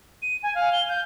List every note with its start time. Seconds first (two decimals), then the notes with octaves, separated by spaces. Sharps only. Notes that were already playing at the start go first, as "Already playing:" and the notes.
0.22 D#7
0.43 G#5
0.55 F5
0.73 G7
0.89 G6